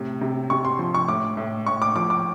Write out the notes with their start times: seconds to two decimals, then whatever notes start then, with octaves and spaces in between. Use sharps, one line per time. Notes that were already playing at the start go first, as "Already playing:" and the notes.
Already playing: A2 C3
0.21 C3
0.50 C3 C#6
0.65 C6
0.79 F3
0.94 C#6
1.08 A2 D6
1.37 A2
1.67 A2 C#6
1.82 D6
1.95 F3 D6
2.10 D6